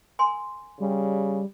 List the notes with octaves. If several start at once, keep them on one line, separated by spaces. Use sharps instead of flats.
A#4 G#5 C6
C#3 G3